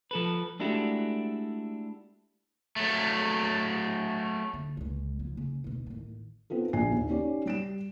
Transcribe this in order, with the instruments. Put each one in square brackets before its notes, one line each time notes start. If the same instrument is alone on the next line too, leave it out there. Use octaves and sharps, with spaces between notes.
[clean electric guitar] F3 A4 B4
G#3 A3 D4 E4 F#4 G4
[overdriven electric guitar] F#3 A3
[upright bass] D3
C#2 G#3
C#3 F3
C#3
D2 B2
A1 D#3
[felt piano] B3 C4 F4 A4
A#1 G#5 C7
D#2
C#4 D#4 G4 C#5 D5
G3 D7 E7